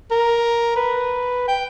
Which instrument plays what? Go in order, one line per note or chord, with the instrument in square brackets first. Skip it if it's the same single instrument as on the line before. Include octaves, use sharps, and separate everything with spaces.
[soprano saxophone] A#4
B4
G5